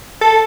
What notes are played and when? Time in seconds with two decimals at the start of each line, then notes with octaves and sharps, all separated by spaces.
0.21 A4